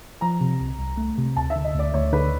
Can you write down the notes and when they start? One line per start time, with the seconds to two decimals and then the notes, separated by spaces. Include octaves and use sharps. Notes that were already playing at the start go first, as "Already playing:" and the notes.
0.21 F3 A#5
0.41 C3
0.60 C2
0.79 C2
0.97 A3
1.18 C3
1.36 D2 A5
1.50 E5
1.56 D3
1.64 D#5
1.75 D2 D5
1.94 D2 C#5
2.13 D3 B4